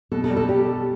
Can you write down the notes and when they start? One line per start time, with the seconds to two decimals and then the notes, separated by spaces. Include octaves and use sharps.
0.12 B2 A4
0.24 A4
0.30 G3
0.36 A4
0.49 G3 G4
0.67 A4